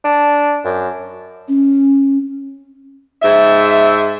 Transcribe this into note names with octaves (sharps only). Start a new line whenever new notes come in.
D4
F#2
C#4
G#2 E5